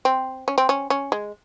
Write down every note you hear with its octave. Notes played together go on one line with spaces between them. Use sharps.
C4
C#4
C4
C#4
C#4
G#3